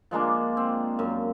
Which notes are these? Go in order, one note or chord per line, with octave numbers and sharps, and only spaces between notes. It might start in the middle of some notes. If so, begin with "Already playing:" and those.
F3 G#3 A#3 D4
C4
F#2